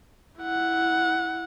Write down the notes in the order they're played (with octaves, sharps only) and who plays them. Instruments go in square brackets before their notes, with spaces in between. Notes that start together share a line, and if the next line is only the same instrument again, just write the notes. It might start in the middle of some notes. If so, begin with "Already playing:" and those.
[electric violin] E4 F#5